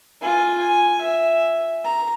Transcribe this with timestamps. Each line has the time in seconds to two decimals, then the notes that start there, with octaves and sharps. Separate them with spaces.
0.22 F4 G#5
0.58 G#5
1.01 E5
1.84 A#5